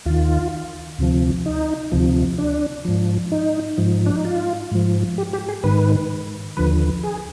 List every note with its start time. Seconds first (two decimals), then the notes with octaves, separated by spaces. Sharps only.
0.06 D#2 D#3 F4
0.98 D2 C3 F3
1.46 D#4
1.92 D2 C3 F3
2.38 D4
2.85 G#2 F3
3.32 D#4
3.78 G#2 F3
4.06 D4
4.16 D#4
4.25 F4
4.71 G#2 F3
5.18 G4
5.33 G4
5.49 G#4
5.64 G#2 D#3 B4
6.57 D#2 D3 F3 B4
7.03 G#4